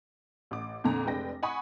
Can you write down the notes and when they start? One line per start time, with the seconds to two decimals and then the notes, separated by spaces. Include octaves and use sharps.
0.51 A1 D6
0.84 F2 A#2 D3 A#5
1.05 F1 G#3 D4 B4 G5 A#6
1.43 F#5 G#5 B5 C#6 D#6